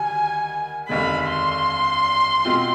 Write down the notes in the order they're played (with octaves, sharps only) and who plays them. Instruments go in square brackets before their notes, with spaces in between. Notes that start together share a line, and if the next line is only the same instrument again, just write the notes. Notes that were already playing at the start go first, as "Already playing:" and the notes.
Already playing: [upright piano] D2 D#3 G3 [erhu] G#5
[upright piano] F1 D#2 D3 G#3 [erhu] B5
[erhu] C6
[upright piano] B1 B2 G#3 C4 F4